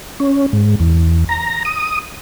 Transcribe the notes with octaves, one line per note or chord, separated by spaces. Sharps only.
C#4
G#2
E2
A#5
D#6